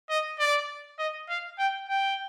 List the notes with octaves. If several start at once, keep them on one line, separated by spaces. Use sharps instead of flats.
D#5
D5
D#5
F5
G5
G5